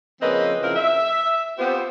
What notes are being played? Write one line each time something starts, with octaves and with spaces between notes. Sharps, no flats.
C#3 F3 A#3 C4 B4 D#5
A#2 C#3 F3 C4 E4 A#4
E5
B3 C4 F4 G4 C5